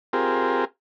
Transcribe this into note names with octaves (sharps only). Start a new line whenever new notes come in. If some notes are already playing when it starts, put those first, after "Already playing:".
C4 F4 G4 G#4 A#4